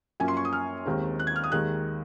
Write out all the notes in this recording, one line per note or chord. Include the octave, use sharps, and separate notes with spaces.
F#2 F3 A#3 C#4 G#5
C6
C#6
D#6
F6
D#2 D#3 G#3 C4
F#6
G#6
F6
D#6
D#2 D#3 G#3 F#6